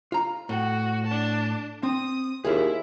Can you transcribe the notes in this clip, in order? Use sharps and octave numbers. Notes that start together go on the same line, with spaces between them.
F4 A#5
A2 F#4
D4 A5
C4 D#6
D#2 E4 F4 G#4